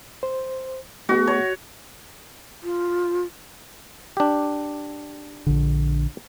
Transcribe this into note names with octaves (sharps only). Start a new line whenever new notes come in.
C5
A3 B3 F#4 G#4
C#5
F4
D4 G4
A#1 D3